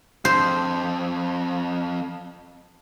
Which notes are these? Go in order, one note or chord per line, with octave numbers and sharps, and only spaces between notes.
F2 C5